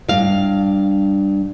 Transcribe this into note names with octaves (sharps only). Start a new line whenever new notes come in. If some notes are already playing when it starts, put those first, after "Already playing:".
G2 F5